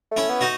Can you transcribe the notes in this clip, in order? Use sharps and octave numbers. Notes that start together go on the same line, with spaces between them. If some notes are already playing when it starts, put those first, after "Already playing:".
A3
C#4 E4
B3
D#4 F#4